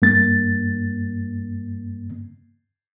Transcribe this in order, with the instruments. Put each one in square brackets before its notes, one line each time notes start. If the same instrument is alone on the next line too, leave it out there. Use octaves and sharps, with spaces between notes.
[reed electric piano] G2 A#3 A6